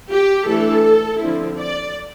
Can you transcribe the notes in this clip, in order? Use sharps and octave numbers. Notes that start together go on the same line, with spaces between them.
G4
E3 A3 D4 A4
D3 F3 C4 E4
D5